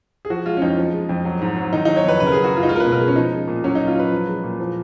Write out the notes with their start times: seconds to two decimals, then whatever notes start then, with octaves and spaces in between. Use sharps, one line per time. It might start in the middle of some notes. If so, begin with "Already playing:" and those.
0.25 G#4
0.30 F3 F#4
0.46 G#3 F4
0.57 C#4
0.62 F2 D#4
0.78 F3
0.93 G#3
1.09 F2
1.25 F#3
1.41 G#2
1.57 F#3
1.73 D#3 D#4
1.85 F#3 D#4
1.97 C#5
2.04 F2 B4
2.20 C#3 B4
2.27 A#4
2.32 F#3 G#4
2.44 F#4
2.53 F#2 F4
2.63 D#4
2.69 G#3 F4
2.76 A#4
2.80 B2 B4
2.92 A#4
3.00 G#3
3.08 C#4
3.16 F3 D#4
3.33 G#3
3.48 A#2
3.64 F#3 C#4
3.75 A#2 D#4
3.87 F4
3.96 F#3 B4
4.11 F3
4.27 G#3
4.44 A#2
4.60 F3